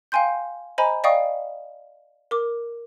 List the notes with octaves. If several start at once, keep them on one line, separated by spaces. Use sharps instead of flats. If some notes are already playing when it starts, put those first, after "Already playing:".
F5 G5 G#5 C6 G6
C5 D#5 G#5 A#5 B5
D5 D#5 F5 G5 C#6 D#6
A#4 D6